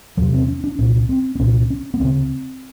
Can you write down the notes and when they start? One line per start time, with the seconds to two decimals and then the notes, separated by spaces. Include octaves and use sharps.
0.17 E2 C3 F#3
0.34 C4
0.48 C#4
0.64 D4
0.79 C2 A#2 C#4
1.09 C4
1.35 C4
1.39 C2 A#2 C#4
1.70 C#4
1.94 B3
2.00 D2 C#3 C4